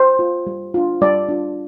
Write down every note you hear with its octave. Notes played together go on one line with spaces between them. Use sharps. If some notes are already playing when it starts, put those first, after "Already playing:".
Already playing: C5
F4
G3
D4 F4
G3 D5
D4 F4